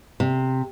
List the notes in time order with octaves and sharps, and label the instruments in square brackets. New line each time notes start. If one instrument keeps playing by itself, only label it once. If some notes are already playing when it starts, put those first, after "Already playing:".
[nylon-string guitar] C3